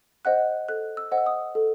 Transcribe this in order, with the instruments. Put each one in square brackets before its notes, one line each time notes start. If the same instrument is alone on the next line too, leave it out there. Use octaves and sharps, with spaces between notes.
[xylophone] C5 D#5 F#5 F#6
A4 F#6
E6
C5 D#5 F#5
E6
D#6
A4